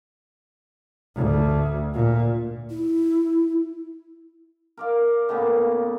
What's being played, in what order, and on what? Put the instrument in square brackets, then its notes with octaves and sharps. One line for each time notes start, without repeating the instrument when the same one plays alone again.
[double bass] D2
A#2
[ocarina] E4
[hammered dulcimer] A#4 D5 F5
A2 C#3 A#3 B3